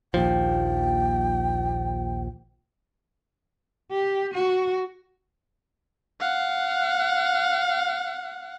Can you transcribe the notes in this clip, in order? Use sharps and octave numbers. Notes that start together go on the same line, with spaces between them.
A#1 D#2 F3 G5
G4
F#4
F5 F#5